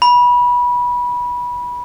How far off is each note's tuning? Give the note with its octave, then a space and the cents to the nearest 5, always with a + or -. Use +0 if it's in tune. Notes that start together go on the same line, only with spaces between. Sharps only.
B5 -20